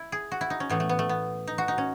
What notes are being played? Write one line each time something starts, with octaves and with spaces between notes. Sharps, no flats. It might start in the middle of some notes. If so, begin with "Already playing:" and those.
Already playing: E4
G#4
F#4
E4
D#4
C#4
A2 E3 A3 B3
A3
B3
A3
B3
D#4
F#4
D#4
C#4